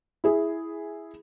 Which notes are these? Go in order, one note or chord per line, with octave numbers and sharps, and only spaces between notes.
E4 G#4